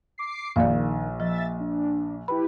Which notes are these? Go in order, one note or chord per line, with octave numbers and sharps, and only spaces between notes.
D6 C7
A#1 D#3 D5 F5
F3 E5 A6
D4
E4 G4 B4 B5